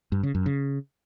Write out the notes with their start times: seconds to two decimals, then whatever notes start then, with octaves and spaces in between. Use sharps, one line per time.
0.12 G2
0.23 C#3
0.35 F#2
0.46 C#3